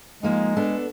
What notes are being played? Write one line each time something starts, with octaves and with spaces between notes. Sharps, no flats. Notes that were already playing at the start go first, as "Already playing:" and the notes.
F3 G#3 A#3 D#4
B3 D4 A4